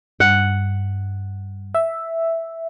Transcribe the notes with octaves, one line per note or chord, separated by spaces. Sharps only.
G2 F#5
E5